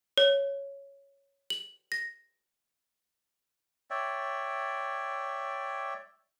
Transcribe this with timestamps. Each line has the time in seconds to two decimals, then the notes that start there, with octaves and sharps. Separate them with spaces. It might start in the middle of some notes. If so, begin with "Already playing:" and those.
0.18 C#5
1.50 F#7
1.92 A#6
3.90 C#5 D5 E5 G5